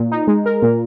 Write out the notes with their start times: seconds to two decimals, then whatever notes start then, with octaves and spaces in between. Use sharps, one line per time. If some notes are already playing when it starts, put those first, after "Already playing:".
Already playing: A#2
0.12 D#4
0.27 G#3
0.46 A#4
0.62 A#2